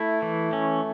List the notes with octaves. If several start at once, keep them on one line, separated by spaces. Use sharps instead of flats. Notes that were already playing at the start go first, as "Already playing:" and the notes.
Already playing: A3 E4
E3
C#4